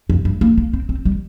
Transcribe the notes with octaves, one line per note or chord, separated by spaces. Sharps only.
F2
G2
A#3
A#3
C4
C4
G3